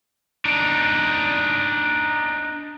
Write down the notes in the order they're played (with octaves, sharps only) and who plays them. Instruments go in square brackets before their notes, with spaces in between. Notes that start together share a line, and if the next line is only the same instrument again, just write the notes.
[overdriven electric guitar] D4 D#4